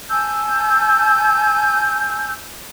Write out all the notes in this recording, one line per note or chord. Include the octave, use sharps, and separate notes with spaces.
G#5 A5 E6 G6